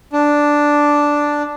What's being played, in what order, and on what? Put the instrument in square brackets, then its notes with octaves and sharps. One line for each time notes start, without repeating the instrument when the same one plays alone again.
[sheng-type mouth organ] D4